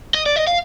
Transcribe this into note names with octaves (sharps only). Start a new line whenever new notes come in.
D#5
D5
D#5
F5